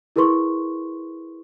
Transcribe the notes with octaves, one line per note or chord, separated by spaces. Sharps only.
E4 G#4 A#4 B4 C6 C#6